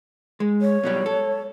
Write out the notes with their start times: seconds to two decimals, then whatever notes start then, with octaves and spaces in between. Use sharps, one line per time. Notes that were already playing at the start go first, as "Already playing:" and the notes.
0.40 G#3
0.61 C#5
0.83 B2 F#3 G3
1.06 A4